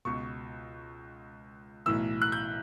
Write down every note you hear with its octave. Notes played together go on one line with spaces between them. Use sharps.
C#2 B2 C#6
B1 A2 E3 E6
F#6
G6